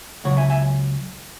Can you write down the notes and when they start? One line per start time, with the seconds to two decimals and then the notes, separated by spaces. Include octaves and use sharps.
0.24 C#2 C#3 F#3 C#5 F#5
0.37 E5 G#5
0.50 E5 G#5